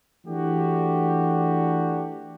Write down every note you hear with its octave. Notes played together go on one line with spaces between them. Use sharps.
E3 A3 D4 F#4 G4